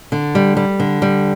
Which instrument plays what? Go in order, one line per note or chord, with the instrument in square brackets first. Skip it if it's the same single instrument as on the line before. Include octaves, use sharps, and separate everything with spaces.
[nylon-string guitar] D3
G3
G3
D3
G3